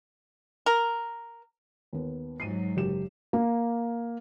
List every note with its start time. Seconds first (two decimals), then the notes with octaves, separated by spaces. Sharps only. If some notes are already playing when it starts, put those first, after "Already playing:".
0.66 A#4
1.93 D#2 B3
2.40 G#2 F#3 C7 D#7
2.76 F#1 G4 E7
3.33 A#3